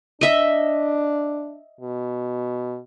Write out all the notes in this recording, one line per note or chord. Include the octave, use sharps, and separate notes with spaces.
D4 D#5 E5
B2